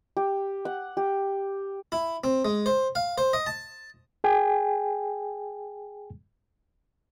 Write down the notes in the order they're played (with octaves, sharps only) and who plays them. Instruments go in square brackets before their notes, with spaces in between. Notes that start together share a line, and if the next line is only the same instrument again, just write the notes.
[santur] G4
F#5
G4
[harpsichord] E4
C4
G#3
C5
F5
C5
D#5
A5
[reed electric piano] G#4 G5 G#5